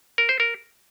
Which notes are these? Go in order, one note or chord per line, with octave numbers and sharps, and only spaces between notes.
A#4
C5
A#4